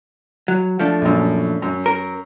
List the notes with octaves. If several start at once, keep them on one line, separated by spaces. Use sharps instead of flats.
F#3
F3 A3 D4
A#1 F#2
F#2
A#4